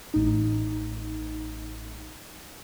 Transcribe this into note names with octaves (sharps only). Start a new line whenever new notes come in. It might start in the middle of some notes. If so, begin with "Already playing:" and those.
A1 D#4